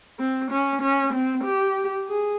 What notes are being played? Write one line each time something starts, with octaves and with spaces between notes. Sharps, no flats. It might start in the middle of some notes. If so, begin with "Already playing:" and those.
C4
C#4
C#4
C4
G4
G#4